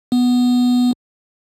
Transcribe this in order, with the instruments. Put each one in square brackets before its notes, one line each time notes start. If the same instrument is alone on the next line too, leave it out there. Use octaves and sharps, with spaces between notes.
[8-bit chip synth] B3